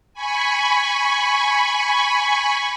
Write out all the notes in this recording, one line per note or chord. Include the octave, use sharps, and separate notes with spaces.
G#5 B5 C#6